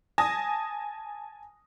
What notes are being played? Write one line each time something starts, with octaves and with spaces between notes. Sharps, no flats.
G#5 A5 D#6 A#6